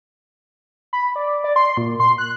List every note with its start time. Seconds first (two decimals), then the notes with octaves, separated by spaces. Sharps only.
0.93 B5
1.16 D5
1.44 D5
1.56 C6
1.77 A#2
2.00 C6
2.18 F#6